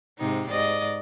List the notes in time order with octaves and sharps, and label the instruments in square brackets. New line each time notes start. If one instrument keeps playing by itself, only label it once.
[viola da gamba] G#2 C3 D#4
G#2 D5 D#5